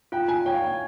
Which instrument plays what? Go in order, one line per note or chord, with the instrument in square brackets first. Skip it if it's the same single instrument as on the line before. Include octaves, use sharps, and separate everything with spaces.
[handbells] F4 [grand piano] G5
[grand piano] G#5
[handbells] C#5 [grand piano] G5
[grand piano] F5
G5